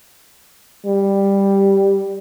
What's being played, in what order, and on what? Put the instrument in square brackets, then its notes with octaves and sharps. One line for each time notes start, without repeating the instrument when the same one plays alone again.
[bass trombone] G3